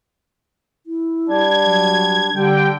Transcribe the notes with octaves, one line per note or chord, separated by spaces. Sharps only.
E4
G3 D4 G#6
F#3
D3 G3 G5